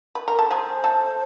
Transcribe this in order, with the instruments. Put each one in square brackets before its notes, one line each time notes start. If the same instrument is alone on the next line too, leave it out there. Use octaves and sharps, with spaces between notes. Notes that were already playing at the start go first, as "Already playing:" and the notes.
[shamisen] B4
A#4
A4
[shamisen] G#3 G#4 [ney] C5
[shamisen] A3 A4